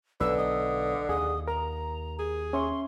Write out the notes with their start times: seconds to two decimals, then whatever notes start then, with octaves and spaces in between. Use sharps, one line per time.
0.20 B1 D3 B4 E6
0.38 D#5 D#6
1.09 D#2 G#4 F#5 D#6
1.48 A#4 A#5
2.19 G#4
2.53 C#4 E5 C6 C#6